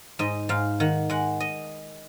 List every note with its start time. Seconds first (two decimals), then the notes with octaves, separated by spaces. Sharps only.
0.19 G#2 D#5
0.49 G#2 F5
0.80 D#3 F#5
1.10 G#3 F#5
1.40 D#5